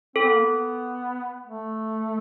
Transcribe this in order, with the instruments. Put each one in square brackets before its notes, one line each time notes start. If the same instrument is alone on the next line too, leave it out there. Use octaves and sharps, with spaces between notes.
[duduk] C4 [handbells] A4
[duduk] B3
A#3
B3
A3